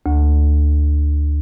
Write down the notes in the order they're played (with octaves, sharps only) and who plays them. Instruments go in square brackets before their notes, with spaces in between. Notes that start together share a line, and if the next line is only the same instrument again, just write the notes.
[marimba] D2